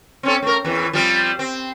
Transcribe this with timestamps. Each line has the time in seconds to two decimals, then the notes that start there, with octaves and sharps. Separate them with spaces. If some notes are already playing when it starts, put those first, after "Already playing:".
0.23 C4 C#4 A4
0.42 A3 A#4
0.64 E2 E3
0.93 F3 G3 C4
1.39 C4